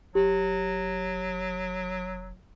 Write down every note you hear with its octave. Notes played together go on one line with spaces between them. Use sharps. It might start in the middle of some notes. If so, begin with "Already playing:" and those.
F1 F#3 G4